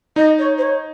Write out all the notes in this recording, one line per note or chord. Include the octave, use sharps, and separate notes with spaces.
D#4 D#5
C#5
C5
C#5